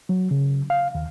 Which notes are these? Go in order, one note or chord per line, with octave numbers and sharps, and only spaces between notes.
F#3
C#3
F5
D#2